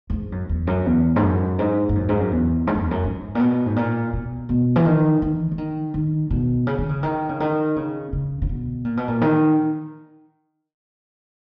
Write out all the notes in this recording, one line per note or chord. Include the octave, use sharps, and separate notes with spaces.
F#2
G#2
F#2
E2
F#2
E2
G#2
F#2
G#2
G#2
F#2
G#2
F#2
E2
G#2
F#2
E2
F#2
G#2
A#2
B2
G#2
A#2
B2
B2
E3
D#3
E3
E3
D#3
D#3
B2
C#3
D#3
C#3
D#3
C#3
D#3
C#3
C#3
C#3
B2
A#2
B2
A#2
D#3